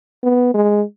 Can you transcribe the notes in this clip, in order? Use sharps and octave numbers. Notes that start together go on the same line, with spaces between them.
B3
G#3